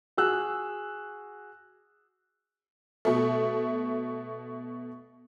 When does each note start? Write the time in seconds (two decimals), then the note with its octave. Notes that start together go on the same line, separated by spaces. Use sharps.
0.17 F#4 G#4 E6 F#6
3.05 B2 A3